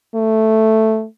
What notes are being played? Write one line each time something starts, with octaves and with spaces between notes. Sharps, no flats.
A3